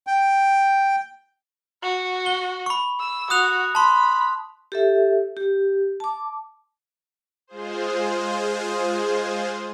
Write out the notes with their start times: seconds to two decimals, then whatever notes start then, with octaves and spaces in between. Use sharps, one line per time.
0.07 G5
1.83 F#4
2.26 G7
2.66 B5 C#6
3.00 E6
3.30 F#4 D#6 F#6 F7
3.75 A5 B5 C6
4.72 G4 A4 E5
5.37 G4
6.00 A5 D6
7.47 G#3 F4 G#4 C5